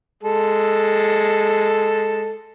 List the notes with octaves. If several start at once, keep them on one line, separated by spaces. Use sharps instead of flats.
G#3 A4